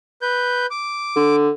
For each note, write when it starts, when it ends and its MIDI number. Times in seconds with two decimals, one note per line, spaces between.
0.22 0.66 71
0.22 0.66 91
0.71 1.36 86
1.16 1.51 50